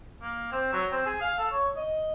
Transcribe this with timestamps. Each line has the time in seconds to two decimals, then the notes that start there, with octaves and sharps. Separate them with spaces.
0.22 A#3
0.52 C4
0.73 F#3
0.92 C4
1.06 G#4
1.21 F5
1.38 A4
1.51 C#5
1.77 D#5